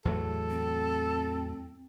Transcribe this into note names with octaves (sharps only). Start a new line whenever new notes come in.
E2 A2 F#3 A4
C4